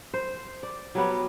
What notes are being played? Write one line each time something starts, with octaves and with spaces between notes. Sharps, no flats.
C5
D5
F#3 G3 B3